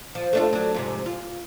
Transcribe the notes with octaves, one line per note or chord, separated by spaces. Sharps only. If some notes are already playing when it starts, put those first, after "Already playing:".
F3
A3 D4 F4
F#3 D4
F2 G#2 C3
F4